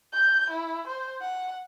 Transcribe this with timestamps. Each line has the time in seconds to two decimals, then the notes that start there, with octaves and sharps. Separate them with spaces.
0.13 G6
0.51 E4
0.87 C5
1.22 F#5